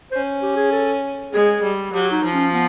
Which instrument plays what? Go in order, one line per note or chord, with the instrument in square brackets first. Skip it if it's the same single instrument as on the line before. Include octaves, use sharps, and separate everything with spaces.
[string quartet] C#4 [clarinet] C5
[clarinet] G4
G#4
A4
[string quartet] G#3 [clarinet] G#4
[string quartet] G3
[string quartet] F#3 [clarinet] G4
[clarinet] D#4
[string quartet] F3
[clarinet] C#4
B3